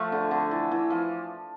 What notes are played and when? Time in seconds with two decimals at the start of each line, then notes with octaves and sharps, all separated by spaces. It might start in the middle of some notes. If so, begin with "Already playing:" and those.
Already playing: F3 A3
0.12 D3
0.31 D3
0.51 E3
0.71 E3
0.90 F3